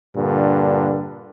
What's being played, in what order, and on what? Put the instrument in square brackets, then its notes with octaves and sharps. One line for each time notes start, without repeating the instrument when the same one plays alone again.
[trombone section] G2 A#2 D3